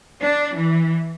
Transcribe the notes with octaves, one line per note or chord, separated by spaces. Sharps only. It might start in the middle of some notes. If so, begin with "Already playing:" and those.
D4
E3